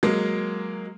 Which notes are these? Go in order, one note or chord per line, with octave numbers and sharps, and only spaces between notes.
F#3 G#3 A#3